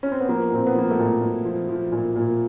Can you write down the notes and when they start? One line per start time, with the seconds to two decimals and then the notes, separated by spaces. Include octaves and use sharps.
0.03 C#4
0.12 C4
0.20 B3
0.28 F3 A#3
0.52 A#2 C4
0.66 B3
0.76 F3 A#3
0.91 A3
0.99 A#2
1.22 A#2
1.45 F3
1.69 F3
1.92 A#2
2.16 A#2